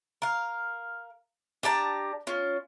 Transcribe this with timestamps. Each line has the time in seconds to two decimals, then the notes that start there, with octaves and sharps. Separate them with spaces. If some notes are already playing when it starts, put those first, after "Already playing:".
0.22 A#4 F5
1.63 D4 G4 A5 A#5
2.27 C#4 F4